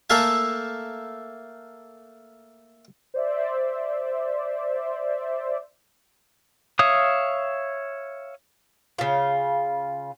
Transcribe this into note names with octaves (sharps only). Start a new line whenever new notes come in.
A3 A#3 A4 E5 F5 G#5
C5 D5 E5
C#5 E5 F5 D#6
C#3 F4